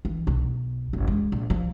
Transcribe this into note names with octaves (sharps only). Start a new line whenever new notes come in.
E3
B1
F#1
G#3
A#1
F3